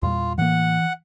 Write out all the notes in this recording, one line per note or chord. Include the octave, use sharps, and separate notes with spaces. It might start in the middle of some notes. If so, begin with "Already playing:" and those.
E2 A#2 G3 F4
A2 E3 A#3 F#5